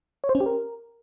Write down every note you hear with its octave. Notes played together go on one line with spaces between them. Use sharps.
C#5
C5
C#4
G4
A#4